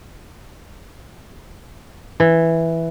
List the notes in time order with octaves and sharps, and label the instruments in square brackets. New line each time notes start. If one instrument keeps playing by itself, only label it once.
[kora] E3